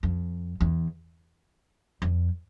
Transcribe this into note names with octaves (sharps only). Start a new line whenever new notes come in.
F2
E2
F2